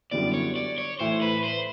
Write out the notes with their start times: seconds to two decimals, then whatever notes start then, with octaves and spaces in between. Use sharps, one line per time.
0.11 F#2 D3 G3 B3 E4 D5
0.34 C#5
0.56 D5
0.78 C#5
0.99 A2 E3 A3 C5
1.22 B4
1.44 C5